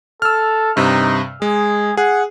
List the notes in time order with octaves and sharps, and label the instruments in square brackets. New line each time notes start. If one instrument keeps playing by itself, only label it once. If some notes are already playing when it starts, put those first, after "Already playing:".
[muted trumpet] A4 [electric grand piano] E6 F6
[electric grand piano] G2 C3 [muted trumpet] D#4
[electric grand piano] G#3 [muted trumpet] G#4
[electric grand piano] G#4 [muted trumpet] F#5